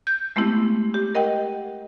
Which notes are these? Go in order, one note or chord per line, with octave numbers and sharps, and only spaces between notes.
G6
G#3 A3 B3 C4 E4 G4
G4
A#4 D#5 F#5 G5